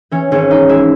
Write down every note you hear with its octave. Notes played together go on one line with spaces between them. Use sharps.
E3 C#4
G#1 C#4
G#3 D#4
G#3 E4